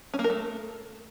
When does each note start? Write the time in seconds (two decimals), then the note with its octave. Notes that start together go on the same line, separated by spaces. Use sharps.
0.14 C#4
0.19 A#3
0.24 A#4
0.30 A3